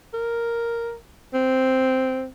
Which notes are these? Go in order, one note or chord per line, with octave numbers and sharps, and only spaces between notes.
A#4
C4